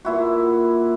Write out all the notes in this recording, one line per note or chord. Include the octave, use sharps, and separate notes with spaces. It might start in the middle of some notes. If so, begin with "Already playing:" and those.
A#2 E4 F#4